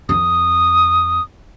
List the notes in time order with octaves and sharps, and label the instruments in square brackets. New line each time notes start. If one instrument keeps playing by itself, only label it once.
[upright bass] F2 C4 [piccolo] D#6